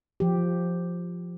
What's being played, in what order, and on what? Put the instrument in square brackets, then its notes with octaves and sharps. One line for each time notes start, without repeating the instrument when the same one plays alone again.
[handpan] F3 G4